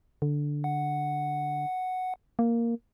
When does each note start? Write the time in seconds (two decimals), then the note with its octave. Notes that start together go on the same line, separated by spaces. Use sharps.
0.22 D3
0.64 F#5
2.39 A#3